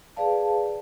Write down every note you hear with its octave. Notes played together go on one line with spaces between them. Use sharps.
G#4 B4 D5 F5 A5